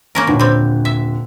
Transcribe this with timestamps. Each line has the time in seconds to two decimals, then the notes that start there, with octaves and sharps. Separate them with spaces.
0.15 A#3 C#4 A#4
0.27 D#1 B2 D3
0.39 G3 C4
0.85 E5